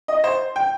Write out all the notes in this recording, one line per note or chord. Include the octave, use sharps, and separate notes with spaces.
D#5
C5
G5